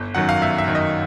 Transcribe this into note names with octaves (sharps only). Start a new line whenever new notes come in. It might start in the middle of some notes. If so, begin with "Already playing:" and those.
Already playing: G1
F#2 D#3 F#3 F#5
F5
G1 E5
E5
F#2 D#3 F#3
D#5